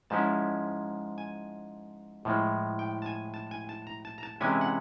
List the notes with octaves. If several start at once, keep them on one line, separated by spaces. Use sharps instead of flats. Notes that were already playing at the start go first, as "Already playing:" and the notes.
G#2 F3 G#3 C#4 E4 A5
G#5
A2 F3 G#3
G5
A5
G#5
A5
G#5
A5
A#5
A5
A#5
A5
C3 E3 G#3 C#4 E4 G#5
F#5